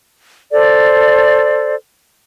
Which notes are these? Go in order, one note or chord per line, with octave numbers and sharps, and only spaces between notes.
A4 C5 D5